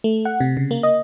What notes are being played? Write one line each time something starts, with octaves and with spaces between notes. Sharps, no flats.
A3
F#5
C3
C#3
A#3
D#5